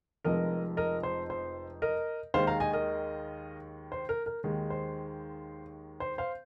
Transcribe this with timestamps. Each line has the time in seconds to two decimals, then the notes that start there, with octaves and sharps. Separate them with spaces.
0.24 F1 F2 F3 G#3 A#4 D#5
0.77 A#4 D#5
1.03 C5
1.30 C5
1.82 A#4 D#5
2.34 D#2 D#3 G#3 C5 F5
2.47 F5 A#5
2.60 D#5 G#5
2.73 A#4 D#5
3.92 C5
4.09 A#4
4.26 A#4
4.44 D#2 D#3 G#3
4.70 C5
6.00 C5
6.18 C5 F5